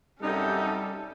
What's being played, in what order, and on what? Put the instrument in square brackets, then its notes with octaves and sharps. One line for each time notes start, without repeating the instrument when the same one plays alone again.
[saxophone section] F#2 C3 D#4 [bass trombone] G3 [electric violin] C#4 A4